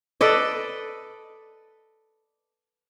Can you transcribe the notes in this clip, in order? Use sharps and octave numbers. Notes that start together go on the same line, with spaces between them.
A4 B4 D5 D#5